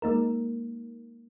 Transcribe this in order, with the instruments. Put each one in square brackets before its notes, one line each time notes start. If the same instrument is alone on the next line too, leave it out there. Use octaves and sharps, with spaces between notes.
[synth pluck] G#3 A#3 D#4 A#4